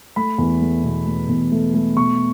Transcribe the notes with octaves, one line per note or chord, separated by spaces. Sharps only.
A3 B5
E2
A3
B2
A3
E2
A3
A3
B2 C#6